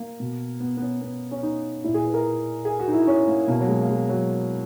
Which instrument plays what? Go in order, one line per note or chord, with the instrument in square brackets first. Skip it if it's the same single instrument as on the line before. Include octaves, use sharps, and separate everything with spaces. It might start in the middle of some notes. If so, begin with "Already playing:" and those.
Already playing: [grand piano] A#3
B2
B3
B3
C#4
B3
C#4
D#4
A#2 E4
G#4
B4
A#4
G#4
F#4
D#4
E4
C#4
A#3
B2 A#3
F#3
G#3
A#3
G#3
F#3